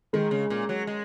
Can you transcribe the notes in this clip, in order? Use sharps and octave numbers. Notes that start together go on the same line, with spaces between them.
D#3 G#3
C#3
A#2
F#3
G#3